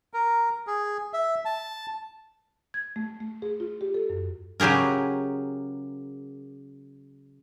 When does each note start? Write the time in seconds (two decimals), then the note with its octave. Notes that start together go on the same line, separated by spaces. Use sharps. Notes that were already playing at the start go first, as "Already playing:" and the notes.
0.14 A#4
0.67 G#4
1.13 E5
1.45 A5
2.74 G#6
2.96 A3
3.20 A3
3.42 G#4
3.60 F4
3.81 G4
3.94 A4
4.10 F#2
4.60 C#3 F#3 G4 G#4 A#4